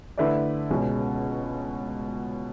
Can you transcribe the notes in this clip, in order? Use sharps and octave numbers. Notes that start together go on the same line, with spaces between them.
D3 A3 E4 B4 D5
C#2 B2 G#3 C#4 F#4